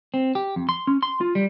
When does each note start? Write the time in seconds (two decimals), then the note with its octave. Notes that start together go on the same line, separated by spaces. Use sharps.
0.14 C4
0.35 G4
0.56 F2
0.69 C6
0.87 C#4
1.03 C6
1.21 F4
1.35 G3